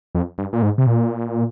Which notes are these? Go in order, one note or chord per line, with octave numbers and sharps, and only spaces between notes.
F2
G2
A#2
G#2
C3
A#2